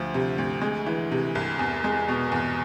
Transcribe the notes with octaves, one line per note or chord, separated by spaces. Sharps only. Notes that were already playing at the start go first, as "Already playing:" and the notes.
Already playing: D2 F3
C3
D2
G#3
E3
C3
C2
E2
G#3
B2
E2